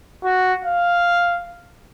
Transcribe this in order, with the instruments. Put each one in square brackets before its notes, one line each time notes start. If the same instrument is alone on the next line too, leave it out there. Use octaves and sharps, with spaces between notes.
[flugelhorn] F#4
F5